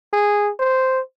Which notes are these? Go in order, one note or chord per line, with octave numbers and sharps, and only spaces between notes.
G#4
C5